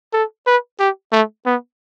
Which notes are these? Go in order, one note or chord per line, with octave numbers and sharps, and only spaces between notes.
A4
B4
G4
A3
B3